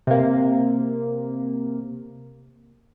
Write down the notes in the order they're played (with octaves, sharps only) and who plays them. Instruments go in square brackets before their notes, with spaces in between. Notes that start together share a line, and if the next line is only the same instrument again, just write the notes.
[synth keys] C3 A#3